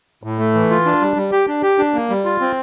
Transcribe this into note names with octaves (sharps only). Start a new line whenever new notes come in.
A2
A3
E3
F4
D4
G3
G3
G4
D4
G4
D4
A#3
G3
F4
C4